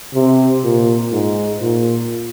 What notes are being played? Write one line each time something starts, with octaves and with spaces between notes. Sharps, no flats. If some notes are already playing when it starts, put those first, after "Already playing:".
C3
A#2
G#2
A#2